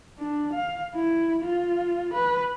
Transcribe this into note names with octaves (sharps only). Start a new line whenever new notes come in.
D4
F5
E4
F4
B4